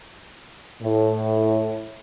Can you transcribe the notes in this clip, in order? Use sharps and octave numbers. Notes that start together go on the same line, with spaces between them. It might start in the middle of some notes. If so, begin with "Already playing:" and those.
A2